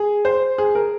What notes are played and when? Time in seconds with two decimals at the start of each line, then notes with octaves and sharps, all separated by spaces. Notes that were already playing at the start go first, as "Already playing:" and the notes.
Already playing: G#4
0.25 C5
0.58 G#4
0.75 A#4